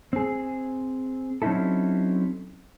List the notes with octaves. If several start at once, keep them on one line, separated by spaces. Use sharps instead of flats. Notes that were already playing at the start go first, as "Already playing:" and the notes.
C4 G#4
F#3 C4 C#4 D#4 E4 A4